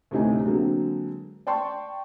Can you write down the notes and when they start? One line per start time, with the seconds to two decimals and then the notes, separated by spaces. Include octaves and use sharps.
0.11 D2 A2 C3 D#4 G#5
0.45 D3 F#3 G#3 A#3 C4
1.47 D5 G5 A5 C6 C#6